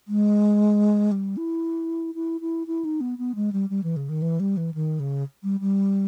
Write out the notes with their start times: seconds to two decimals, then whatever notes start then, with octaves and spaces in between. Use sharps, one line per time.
0.08 G#3
1.11 G3
1.37 E4
2.15 E4
2.41 E4
2.67 E4
2.84 D#4
3.01 B3
3.18 B3
3.35 G#3
3.52 G3
3.70 G3
3.83 E3
3.96 C#3
4.09 D#3
4.22 E3
4.40 G3
4.57 E3
4.74 D#3
5.00 C#3
5.43 G3
5.60 G3